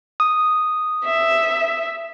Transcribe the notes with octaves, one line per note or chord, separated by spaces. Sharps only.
D#6
E5